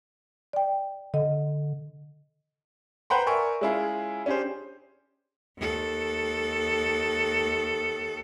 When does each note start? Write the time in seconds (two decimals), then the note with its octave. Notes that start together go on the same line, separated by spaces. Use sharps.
0.53 D5 G5
1.14 D3 D#5
3.10 B4 C5 F#5 G5 A#5 C6
3.26 A#4 D5 E5 G#5 C#6
3.61 G#3 C#4 E4 F4 G#4
4.26 C#4 D4 G4 G#4 C5
5.59 D#2 A4